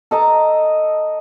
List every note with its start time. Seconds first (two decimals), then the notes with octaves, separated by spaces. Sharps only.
0.11 A4 D#5 A5 A#5